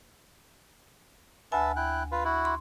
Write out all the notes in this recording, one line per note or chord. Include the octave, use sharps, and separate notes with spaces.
D2 B4 E5 G#5 A5
E4 G5 F#6
F4 B4
E4 F#4
C6